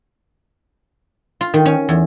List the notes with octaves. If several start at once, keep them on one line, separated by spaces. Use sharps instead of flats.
F4
D#3
C#4
E2